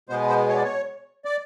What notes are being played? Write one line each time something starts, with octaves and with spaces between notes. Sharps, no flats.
B2 G#3 B3 C5
C5
C#5
D5
C#5
D5